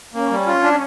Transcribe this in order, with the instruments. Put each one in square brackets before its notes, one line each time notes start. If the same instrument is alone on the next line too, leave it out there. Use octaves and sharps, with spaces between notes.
[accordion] A#3 [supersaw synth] C#4
[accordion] G3
F4
D4